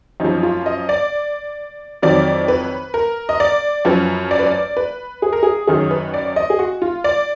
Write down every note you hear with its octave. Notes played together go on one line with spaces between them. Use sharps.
F#2 F3 D#4
F4
D#5
D5
F2 D#3 F#3 D5
B4
A#4
D#5
D5
F#2 F3 B4
D5
B4
D5
B4
G#4
A#4
G#4
F#2 D#3 F#3 G#4
B4
D5
D#5
G#4
F#4
F4
D5